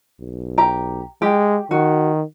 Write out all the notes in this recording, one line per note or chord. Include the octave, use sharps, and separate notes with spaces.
B1
G4 A#5
G#3 G4
D#3 F#4